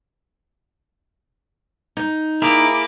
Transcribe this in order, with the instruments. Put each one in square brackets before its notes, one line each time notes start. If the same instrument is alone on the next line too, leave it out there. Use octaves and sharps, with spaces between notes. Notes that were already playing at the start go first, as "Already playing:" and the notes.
[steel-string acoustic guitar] D#4
[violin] A#3 [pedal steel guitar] E4 G#4 A#4 [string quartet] D6